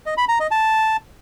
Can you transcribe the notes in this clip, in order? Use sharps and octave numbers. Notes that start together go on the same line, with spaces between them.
D#5
B5
A#5
D#5
A5